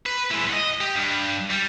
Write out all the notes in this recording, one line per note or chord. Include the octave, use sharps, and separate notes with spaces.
B4
G#3 E4
D#5 F#5
G4
G2
G3